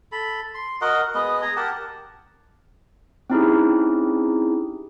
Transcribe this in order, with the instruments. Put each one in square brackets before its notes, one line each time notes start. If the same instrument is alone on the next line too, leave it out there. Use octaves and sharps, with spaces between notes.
[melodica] A4 B5
C6
F#4 A#4 D#5 F#5
G#3 B3 D#5
G#4 G#5 A#5
G4 A#4 F#5 A5
[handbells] C4 C#4 D#4 E4 G4 G#4